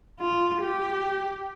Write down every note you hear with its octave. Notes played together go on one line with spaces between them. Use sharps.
F4
G4